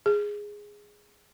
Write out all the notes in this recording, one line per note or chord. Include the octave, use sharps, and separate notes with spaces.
G#4